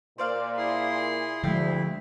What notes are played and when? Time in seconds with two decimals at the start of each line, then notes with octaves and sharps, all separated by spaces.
0.18 A#2 C5 D5 F5
0.57 E4 G#4 C6
1.43 D2 D3 F3 G#3 E4 E5 F5 G5